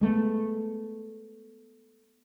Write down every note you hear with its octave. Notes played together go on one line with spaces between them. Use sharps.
G#3 A3 B3